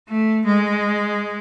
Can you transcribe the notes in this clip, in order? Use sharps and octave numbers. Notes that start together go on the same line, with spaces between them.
A3
G#3